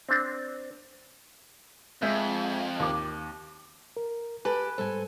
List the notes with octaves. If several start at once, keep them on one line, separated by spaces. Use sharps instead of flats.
C4 D4
F2 G#3 E5 G6
D#2 D6
A#4
G4 A4 B4 G#5
G#2 G3 A4 C5 G#5